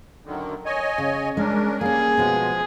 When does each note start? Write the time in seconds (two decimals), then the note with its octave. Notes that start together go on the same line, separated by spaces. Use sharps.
0.25 F#2 D3 D#3
0.66 C#5 D#5 G#5
0.98 C#3
1.37 G#3 C#4 D4 A#4
1.81 G3 A#3 C#4 G#4
2.17 B2 F3 G#3 B3